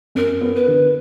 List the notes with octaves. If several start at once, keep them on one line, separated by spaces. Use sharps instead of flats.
F#2 A#4
B3
B4
D3